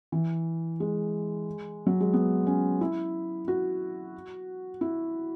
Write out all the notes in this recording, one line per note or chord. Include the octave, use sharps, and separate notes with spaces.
E3
G#3
F#3
G#3
B3
C#4
E4
F#4
E4